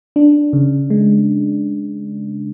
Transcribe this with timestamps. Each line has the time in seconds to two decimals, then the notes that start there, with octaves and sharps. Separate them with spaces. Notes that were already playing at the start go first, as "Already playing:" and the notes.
0.16 D4
0.53 C#3
0.90 G#3